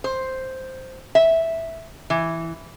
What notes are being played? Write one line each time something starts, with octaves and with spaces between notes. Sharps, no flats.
C5
E5
E3